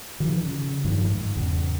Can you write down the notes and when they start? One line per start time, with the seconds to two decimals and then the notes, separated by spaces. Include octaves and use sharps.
0.20 D#3 F3
0.43 C#3
0.85 G2 D#3 F3
1.10 G#2
1.37 E2 C#3